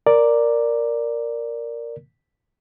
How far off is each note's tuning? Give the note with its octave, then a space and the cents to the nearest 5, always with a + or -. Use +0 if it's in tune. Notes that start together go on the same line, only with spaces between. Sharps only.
A#4 +0 D5 +0